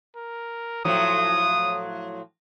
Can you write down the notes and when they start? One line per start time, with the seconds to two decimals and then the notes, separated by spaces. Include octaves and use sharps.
0.16 A#4
0.85 A2 F3 F#3 D#6